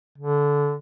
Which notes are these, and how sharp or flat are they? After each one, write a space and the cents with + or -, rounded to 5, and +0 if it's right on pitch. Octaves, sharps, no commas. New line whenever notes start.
D3 -20